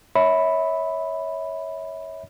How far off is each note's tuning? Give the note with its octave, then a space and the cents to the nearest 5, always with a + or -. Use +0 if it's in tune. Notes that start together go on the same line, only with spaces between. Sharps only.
C#5 +0 E5 -30 B5 +0